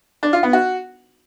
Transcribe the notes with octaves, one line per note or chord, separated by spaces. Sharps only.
D4
F4
B3
F#4